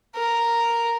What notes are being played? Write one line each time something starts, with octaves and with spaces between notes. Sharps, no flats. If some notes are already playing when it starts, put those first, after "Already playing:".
A#4